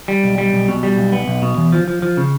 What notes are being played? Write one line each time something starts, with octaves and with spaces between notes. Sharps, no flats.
G3
B1
G3
B1
B2
G3
B1
B3
B1
B2
E2
F3
F3
F3
C#3